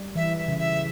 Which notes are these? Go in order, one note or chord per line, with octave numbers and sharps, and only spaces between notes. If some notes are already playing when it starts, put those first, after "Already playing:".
Already playing: G3
E3 E5
E5
C#3
E5